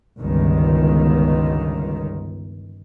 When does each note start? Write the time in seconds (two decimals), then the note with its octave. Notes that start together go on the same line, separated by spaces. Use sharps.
0.19 G1 C#2 D#3